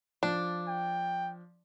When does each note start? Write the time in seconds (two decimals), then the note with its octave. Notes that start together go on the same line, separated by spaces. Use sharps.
0.23 F3 D4
0.68 G5